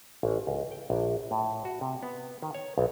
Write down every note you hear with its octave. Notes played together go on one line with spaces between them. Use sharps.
A1
C#2
G5
A#1
A2
F#4
C3
B3
D#3
C#5
B1